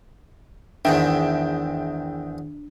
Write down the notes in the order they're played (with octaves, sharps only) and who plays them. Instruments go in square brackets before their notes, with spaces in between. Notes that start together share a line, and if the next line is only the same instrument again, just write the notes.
[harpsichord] E2 G#2 D#3 [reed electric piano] D4 [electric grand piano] E5 G5